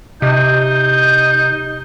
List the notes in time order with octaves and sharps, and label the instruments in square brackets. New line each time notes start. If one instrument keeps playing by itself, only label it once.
[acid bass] C3 [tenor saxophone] D#4 [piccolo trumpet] G6